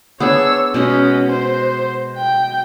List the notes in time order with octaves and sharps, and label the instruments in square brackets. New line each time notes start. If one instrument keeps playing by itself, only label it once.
[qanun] B3 D4 G#4 [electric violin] C#5 E6
[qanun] B2 G#3 D#5 [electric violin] C#4
[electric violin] C5
G5